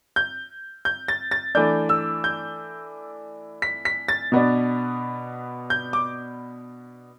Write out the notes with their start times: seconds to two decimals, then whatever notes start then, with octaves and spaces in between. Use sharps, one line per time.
0.16 G6
0.85 G6
1.08 A6
1.31 A6
1.55 E3 A3 D4 G6
1.89 E6
2.24 G6
3.62 B6
3.85 B6
4.08 A6
4.32 B2 B3 D4
5.70 G6
5.93 D6